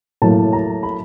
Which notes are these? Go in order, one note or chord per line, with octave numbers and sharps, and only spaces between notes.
A2 F#3 A#3 A5
A#5
B5